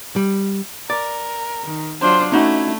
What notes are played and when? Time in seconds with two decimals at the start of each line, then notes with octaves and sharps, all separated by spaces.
0.16 G3
0.90 A#4 D5
1.64 D#3
2.01 F#3 D4 F4 C5
2.32 A3 C#4 D#4 E4 F#4